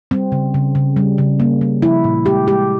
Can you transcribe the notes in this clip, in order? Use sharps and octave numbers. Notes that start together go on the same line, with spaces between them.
G3 C4
C#3
C#3
C#3
G3
C#3
A#3
G3
F3 E4
A#2
G#3 G4
G#3 G4